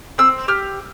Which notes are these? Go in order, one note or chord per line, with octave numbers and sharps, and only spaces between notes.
C4 E6
G4 F6